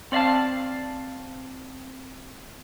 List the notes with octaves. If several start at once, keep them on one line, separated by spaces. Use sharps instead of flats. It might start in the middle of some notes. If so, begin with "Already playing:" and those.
C4 D5 E5 F5 A5